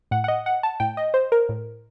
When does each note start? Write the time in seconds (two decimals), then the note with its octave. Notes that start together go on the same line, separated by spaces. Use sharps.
0.11 A2 F#5
0.24 F#5
0.28 D#5
0.46 F#5
0.63 A5
0.80 A2 G5
0.97 D#5
1.14 C5
1.32 A#4
1.49 A2